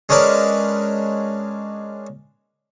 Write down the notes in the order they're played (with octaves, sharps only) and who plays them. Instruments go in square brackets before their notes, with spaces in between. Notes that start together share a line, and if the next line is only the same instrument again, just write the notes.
[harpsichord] G#3 C#4 D4 A#4 B4